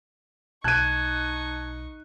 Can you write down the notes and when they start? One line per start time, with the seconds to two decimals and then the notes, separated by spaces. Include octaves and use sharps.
0.64 B1 D#4 A5 C#6 F#6 G#6 D#7